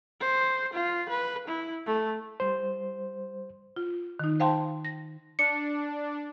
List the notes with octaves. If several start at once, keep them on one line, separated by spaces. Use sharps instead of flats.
C5
F4
B4
E4
A3
G3 C5
F4
D#3 D#4
C5 F5 G5 A5 C6
A#6
D4 C#7